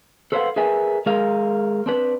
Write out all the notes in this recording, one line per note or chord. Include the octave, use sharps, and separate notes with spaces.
A4 B4 C5 D5 F5 F#5
G#4 A#4 B4 E5 G#5
G#3 G#4 A#4 F5
C4 D4 B4